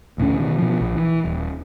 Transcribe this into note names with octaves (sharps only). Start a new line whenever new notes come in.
A1 D2 A#2 C#4
B2 D#3
B2 F3
A#1
E3
D#1